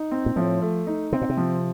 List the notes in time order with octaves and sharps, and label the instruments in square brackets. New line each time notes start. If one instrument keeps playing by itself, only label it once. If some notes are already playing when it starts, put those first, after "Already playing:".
Already playing: [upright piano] D#4
C4
[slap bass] A#2
[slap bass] A2 [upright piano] F3
[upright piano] A3
D#4
[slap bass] C3 [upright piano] C4
[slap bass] A#2
C3
[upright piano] F3